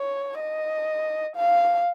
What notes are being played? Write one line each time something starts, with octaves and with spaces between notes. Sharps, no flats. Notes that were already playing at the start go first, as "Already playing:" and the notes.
Already playing: C#5
D#5
F5